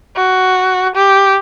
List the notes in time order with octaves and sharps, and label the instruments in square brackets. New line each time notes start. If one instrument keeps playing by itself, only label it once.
[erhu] F#4
G4